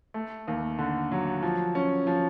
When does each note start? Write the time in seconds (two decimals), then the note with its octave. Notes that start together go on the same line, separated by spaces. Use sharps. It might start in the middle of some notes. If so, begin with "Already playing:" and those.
0.14 A3
0.48 D#2
0.78 D3
1.11 F#3
1.43 F3
1.75 C#4
2.07 F3